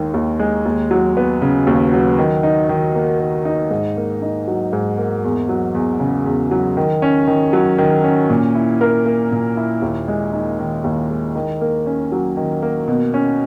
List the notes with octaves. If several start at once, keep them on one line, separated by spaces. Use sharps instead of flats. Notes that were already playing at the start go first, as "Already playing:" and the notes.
Already playing: D#2 D#3 G#3 D#4
D#2
G#3
D#2
F#3
B3
C#3
D#2
F#3
D#3
D#4
D#3
A#3
D#3
D#4
G#2
A#3
D#4
F#3
G#2
A#3
E2
F#3
E2
C#3
E2
F#3
D#3
C#4
D#3
F#3
D#3
C#4
A#2
E4
A#4
A#3
A#2
E4
D#2
G#3
D#4
D#3
D#2
G#3
D#3
A#3
C#4
F#3
D#3
A#3
B2
C#4